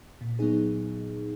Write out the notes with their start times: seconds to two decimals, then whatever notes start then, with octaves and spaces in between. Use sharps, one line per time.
0.21 A#2
0.39 F#3 B3 D#4 G#4